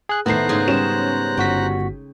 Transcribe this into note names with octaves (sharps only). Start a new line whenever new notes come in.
G#4 F#6
A2 D#3 A3 B3 C5 A#5 F#6 C7
G#2 C#3 G#4
G3 C#4 E7
G1 F#4 G5 B6